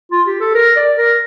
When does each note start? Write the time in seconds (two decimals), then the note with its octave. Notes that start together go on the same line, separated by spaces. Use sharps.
0.12 F4
0.27 G4
0.41 A4
0.55 A#4
0.77 D5
0.98 A#4